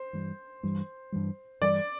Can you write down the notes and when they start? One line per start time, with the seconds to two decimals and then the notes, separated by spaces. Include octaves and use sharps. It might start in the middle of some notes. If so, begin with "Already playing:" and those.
Already playing: C5
0.13 G2 E3 G3
0.63 G2 E3 G3
1.12 G2 E3 G3
1.61 G2 E3 G3 D5